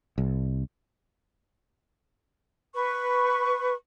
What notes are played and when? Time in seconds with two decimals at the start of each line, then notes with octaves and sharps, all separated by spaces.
0.18 C2
2.75 B4 C#6